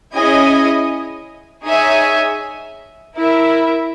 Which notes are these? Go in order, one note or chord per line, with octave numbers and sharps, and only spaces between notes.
C#4 E4 G#4 D#5 G#5
D#4 G#4 C#5 E5 G#5
E4 A#4 E5